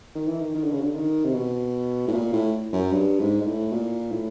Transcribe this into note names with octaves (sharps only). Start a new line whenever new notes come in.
D#3
E3
D#3
D#3
D3
C#3
D3
D#3
C3
B2
A2
A#2
A2
F#2
G2
G#2
G#2
A2
A#2
A2